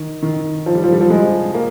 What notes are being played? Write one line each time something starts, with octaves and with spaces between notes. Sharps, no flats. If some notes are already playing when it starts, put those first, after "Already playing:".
Already playing: D#3
D#3
F3
G3
F3
G3
F3
G#3
A#3